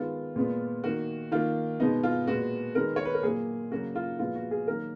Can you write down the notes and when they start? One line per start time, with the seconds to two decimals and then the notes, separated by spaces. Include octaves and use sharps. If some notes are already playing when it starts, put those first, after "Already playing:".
Already playing: D#3 G#3 B3 F4
0.36 A#2 G#3 B3
0.84 D#3 A#3 F#4
1.32 D#3 A#3 F4
1.80 B2 G#3 B3 D#4
2.03 F4
2.27 A#2 G#3 B3 F#4
2.75 D#3 G#3 B3 A#4
2.96 C#5
3.05 B4
3.14 A#4
3.23 A#2 F#3 A#3 G#4
3.71 C#3 F#3 A#3 F#4
3.95 F4
4.19 A#2 F3 G#3 B3 F4
4.35 F#4
4.51 G#4
4.67 D#3 F#3 A#3 A#4